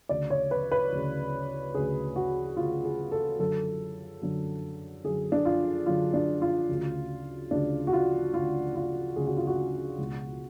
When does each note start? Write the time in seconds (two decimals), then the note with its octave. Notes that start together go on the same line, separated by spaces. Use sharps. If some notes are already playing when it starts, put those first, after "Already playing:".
0.09 D2 C#3 D5
0.30 C#5
0.51 B4
0.72 B4
0.92 D2 C#3
1.74 D2 C#3 G#4
2.16 F#4
2.57 D2 C#3 F4
2.85 G#4
3.12 A4
3.39 F#2 D3 A4
4.22 F#2 D3
5.04 F#2 D3 G#4
5.32 D4
5.45 F4
5.86 F#2 D3 F4
6.14 D4
6.42 F4
6.69 D2 C#3
7.51 D2 C#3 D4
7.87 F#4
7.93 F4
8.34 D2 C#3 F4
8.76 F4
9.16 D2 C#3 G#4
9.26 F#4
9.37 F4
9.47 F#4
9.98 C#2 B2